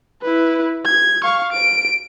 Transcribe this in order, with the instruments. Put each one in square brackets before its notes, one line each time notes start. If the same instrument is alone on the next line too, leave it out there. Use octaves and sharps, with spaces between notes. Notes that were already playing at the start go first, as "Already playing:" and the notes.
[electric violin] E4 B4
G#6
F5 C#6
D7